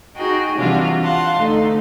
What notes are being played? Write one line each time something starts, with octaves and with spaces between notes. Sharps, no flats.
D#4 F#4 G#4 G5
C3 E3 G3 D4 F4 F#4
F5 F#5 A5 C6
D2 D#4 A4